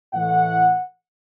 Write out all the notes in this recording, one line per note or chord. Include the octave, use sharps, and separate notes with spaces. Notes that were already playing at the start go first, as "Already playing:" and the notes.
A2 E3 A3 F#5